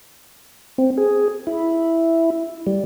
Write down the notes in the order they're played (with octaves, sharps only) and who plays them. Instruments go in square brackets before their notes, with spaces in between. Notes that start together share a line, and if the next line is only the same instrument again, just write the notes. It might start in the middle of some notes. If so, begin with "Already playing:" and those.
[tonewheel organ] C4
G#4
E4
G3